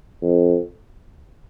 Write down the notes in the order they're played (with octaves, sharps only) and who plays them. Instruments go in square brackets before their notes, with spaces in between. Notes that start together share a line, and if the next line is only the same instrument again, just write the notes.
[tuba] F2